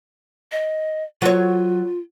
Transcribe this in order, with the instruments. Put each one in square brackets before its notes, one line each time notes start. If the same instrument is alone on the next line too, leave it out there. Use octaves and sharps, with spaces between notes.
[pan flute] D#5
[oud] F#3 C#5 [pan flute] F4